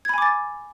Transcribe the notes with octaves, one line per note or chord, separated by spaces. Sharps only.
G#5 B5 D6 G#6 A6